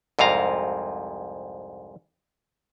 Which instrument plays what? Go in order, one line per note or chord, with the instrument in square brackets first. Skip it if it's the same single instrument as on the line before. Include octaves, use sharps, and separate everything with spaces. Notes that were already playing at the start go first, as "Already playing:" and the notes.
[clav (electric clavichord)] C2 F2 G#2 F5 A#5